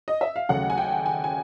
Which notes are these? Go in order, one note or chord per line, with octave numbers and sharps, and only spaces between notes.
D#5
E5
F5
D#2 C#3 F#3 A3 F#5
G#5
G5
G#5
G#5